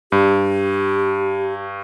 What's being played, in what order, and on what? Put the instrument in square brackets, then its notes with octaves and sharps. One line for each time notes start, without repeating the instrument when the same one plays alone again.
[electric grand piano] G2 [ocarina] G4